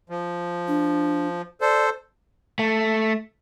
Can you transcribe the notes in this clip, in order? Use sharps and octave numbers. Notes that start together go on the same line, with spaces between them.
F3
D4
A4 C5 D5
A3